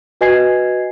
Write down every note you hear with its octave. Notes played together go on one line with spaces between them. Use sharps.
F#4 B4 D#5 G#5 G#6 C7